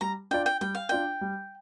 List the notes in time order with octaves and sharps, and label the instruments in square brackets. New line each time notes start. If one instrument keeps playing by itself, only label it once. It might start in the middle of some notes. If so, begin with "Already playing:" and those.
[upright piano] G3 [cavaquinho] A#5
[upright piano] D4 F4 D5 [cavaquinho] G5
[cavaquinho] G5
[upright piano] G3 [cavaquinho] G5
[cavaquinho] F5
[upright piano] D4 F4 D5 [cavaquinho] G5
[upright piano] G3